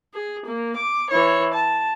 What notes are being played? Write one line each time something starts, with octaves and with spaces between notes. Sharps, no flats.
G#4
A#3
D6
E3 C#5
A5